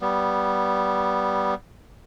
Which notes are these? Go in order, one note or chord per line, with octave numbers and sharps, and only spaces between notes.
G3 B3